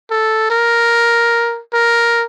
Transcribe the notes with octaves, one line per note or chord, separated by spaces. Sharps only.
A4
A#4
A#4